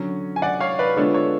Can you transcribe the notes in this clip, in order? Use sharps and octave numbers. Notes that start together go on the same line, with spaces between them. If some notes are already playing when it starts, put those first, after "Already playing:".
Already playing: D3 F#3 C#4
G#5
D5 F#5
C#5 F5
B4 D5
D3 G#3 B3 D4 F4 A4 C#5
A4 C#5